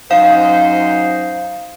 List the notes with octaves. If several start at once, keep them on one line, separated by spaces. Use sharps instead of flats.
F#2 D#4 C5 F5